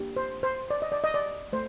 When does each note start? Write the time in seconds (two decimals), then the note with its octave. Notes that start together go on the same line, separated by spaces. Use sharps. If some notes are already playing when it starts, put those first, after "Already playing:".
Already playing: A#3 D4 G4
0.16 C5
0.43 C5
0.70 D5
0.82 D#5
0.92 D5
1.04 D#5
1.14 D5
1.53 A3 C5